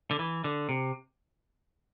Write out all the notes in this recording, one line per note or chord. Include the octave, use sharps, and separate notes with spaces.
D3
E3
D3
C3